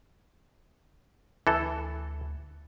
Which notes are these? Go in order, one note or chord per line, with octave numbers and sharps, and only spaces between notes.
D2 E3 A4